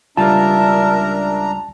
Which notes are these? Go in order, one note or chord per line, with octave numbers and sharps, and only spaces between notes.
C#2 G3 D4 F4 A#4 E5 A5 A#5